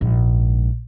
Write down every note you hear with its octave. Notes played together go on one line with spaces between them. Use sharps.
A#1 G#2